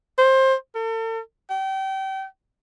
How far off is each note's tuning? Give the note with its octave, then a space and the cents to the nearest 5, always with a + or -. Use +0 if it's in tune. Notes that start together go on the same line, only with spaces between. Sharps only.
C5 +20
A4 +40
G5 -30